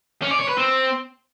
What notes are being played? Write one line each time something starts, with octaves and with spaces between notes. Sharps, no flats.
C#4
D5
C#5
B4
C4